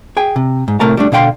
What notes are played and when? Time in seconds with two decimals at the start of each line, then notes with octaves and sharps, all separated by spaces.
0.17 G#4 G5 G#5
0.36 C3
0.68 G#2
0.80 A2 C3 A3 A#4 A5 A#5
0.97 G3 A3 D4
1.12 B2 D3 F5 G5 C6